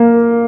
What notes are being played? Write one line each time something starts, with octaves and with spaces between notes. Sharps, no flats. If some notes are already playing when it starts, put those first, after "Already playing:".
Already playing: A#3